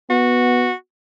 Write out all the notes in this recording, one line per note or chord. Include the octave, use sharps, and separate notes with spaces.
B3 F#4